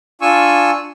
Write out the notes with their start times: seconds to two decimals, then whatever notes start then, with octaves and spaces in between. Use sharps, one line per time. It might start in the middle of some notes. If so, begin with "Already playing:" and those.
0.21 D4 F4 G#5 C#6 E6